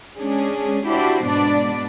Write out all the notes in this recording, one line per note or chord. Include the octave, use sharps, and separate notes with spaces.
G#3 C#4 D4 G#4
D4 E4 F#4 G4 C5 D5
G#2 B2 B3 D4 D5